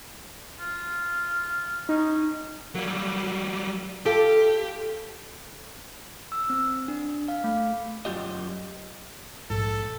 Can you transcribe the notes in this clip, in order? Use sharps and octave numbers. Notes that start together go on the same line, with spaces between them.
F4
C#4 D#4
F#3 G3 A#3
F4 G4 A4 E5
E6
C4
D4
F5
A3
F#2 G#3 F4 G4 D#5
A#1 G#2 A4